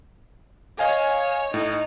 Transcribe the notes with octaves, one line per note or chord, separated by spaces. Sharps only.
C#5 D#5 F5 G#5
A2 D#4